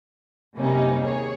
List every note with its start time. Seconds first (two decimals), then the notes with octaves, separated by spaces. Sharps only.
0.56 F#2 C3 G3 A#3 C#4 D#4
1.02 D#2 G#4 C#5